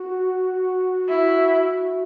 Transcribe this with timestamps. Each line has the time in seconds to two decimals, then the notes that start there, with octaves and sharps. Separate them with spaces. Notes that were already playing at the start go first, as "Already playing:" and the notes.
Already playing: F#4
1.09 E4